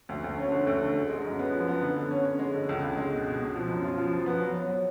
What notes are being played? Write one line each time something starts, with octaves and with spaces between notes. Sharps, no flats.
D2
D2
C#4
D3
D2
D3
G#3
G#3
F#2
B3
F3
B3
D3
D3
C#4
C#4
G#3
D3
C#2
C#2
G#3
B2
B2
B2
F3
F#2
F4
F3
F3
B3
F#3
F#3